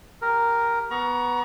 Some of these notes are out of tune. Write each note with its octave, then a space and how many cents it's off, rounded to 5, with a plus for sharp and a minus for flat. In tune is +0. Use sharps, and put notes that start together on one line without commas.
G4 +0 A#4 +0
B3 +0 A#5 +25 C#6 +20